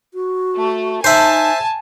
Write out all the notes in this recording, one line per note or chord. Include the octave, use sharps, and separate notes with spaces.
F#4
A3
D#4 C5 E5 G#5 A5